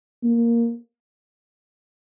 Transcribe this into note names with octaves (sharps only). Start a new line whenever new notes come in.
A#3